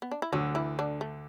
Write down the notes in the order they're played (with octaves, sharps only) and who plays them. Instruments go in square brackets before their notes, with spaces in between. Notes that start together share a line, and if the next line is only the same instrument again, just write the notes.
[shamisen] B3
D4
E4
[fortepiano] D2 D3 [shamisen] F#3 F#4
[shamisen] E3 E4
D3 D4
A3